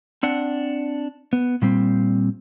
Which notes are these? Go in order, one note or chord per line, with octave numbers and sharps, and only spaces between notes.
C4 D4 F#5
B3
A#2 G3 C4